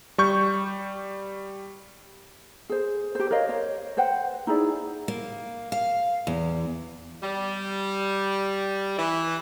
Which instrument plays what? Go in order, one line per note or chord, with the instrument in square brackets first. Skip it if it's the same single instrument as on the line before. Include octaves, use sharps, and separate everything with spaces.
[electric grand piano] G3 C#6 G6
[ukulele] G#4 C5
G4 C5
A#4 C#5 D#5 F5
C5 C#5
B4 C5 F#5 G5
D#4 E4 G#4 D5
[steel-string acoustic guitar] A#3
F5
E2
[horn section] G3
E3